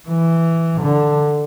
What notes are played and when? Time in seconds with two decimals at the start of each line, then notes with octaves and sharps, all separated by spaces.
0.08 E3
0.82 D3